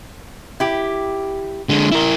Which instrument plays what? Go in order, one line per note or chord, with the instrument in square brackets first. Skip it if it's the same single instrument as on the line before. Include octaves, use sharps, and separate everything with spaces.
[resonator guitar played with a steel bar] E4 G4
[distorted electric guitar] D3 G#3
E4 A#4